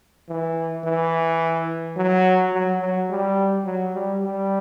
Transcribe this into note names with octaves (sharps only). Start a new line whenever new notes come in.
E3
E3
F#3
F#3
F#3
G3
F#3
G3
G3